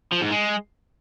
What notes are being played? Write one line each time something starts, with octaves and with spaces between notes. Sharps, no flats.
F3
G#2
G#3